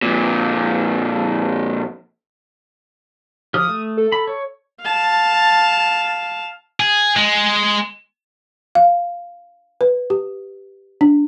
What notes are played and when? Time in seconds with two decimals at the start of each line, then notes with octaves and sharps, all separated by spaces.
0.02 F2 A#2
3.54 F3 G4 D#6 F6
3.68 A3
3.97 A4
4.12 B5
4.27 C#5
4.81 F5 A5
6.80 G#4
7.17 G#3
8.75 F5
9.81 B4
10.10 G4
11.01 D4